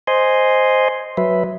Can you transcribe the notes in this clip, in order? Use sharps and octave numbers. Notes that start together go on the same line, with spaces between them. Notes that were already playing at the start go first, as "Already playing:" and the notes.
C5 D#5 G#5 C6
F#3 B4 E5